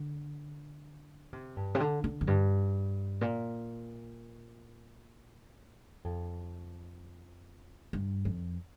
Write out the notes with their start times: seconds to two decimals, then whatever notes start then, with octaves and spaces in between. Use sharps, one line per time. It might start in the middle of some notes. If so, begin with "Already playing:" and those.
Already playing: D3
1.33 C3
1.57 G2
1.75 C3
1.80 D3
2.04 D3
2.21 F2
2.27 G2
3.21 A#2
6.04 F2
7.93 G2
8.25 F2